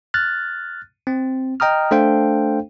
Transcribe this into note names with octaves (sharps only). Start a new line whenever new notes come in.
F6 F#6 A6
C4
D#5 G5 A#5 D#6 F6
A3 D4 A4 C5 F5 G5